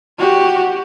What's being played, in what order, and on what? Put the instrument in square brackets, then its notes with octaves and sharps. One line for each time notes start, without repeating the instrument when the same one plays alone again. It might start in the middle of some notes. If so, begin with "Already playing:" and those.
[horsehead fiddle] F#4 G4